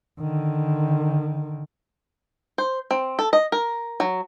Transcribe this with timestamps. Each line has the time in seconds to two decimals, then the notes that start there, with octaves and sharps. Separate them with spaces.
0.21 D3 D#3
2.58 C5
2.91 C4
3.19 A4
3.33 D#5
3.52 A#4
4.00 F#3